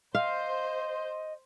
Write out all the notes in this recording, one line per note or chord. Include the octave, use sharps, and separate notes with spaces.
C5 D#5 F5